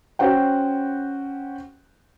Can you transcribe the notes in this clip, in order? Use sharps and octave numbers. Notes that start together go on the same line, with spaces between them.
C#4 F#4 C5 F#5 G5